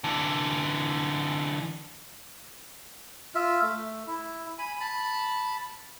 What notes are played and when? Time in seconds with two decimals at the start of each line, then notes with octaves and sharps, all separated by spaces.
0.04 D3 E3
3.35 F4 E5
3.62 A3
4.07 E4
4.59 G#5 B5
4.80 A5 B5